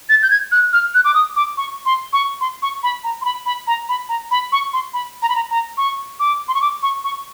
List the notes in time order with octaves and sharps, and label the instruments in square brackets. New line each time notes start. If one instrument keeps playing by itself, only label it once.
[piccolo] A6
G6
G#6
F#6
F6
F#6
D6
D#6
D6
C#6
C6
C#6
C6
C#6
B5
A#5
C6
B5
B5
A#5
B5
A#5
B5
C#6
C6
B5
A#5
B5
A#5
A#5
C#6
D6
C6
C#6
D6
C#6
C#6